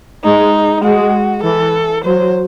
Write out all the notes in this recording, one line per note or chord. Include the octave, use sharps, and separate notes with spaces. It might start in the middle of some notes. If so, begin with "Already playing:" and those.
G#3 D#4
G#3 F#4
E3 A4
F#3 C5